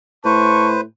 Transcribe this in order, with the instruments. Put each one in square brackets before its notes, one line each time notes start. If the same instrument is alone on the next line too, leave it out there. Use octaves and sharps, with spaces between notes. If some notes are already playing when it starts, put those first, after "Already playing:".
[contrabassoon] A2 [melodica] B4 C5 [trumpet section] A5 C#6